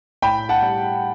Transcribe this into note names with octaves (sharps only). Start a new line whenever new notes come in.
A2 G5 B5
F#5 A5
G3